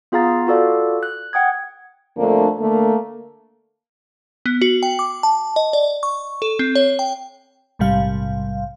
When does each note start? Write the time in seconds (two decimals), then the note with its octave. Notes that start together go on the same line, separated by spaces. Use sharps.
0.12 B3 F4 G#4 F5 A#5 A6
0.47 F4 F#4 A4 D5 F5
1.03 F#6
1.33 F#5 G5 D#6 G#6
2.17 F2 D3 A3 A#3 D4
2.59 D3 A3 A#3
4.46 B3
4.61 F#4
4.83 G5
4.99 D6
5.23 A5
5.56 D#5
5.73 D5
6.03 C#6
6.42 A4
6.59 C4
6.75 C#5
6.99 G5
7.79 A#1 G#2 C3 G3 F5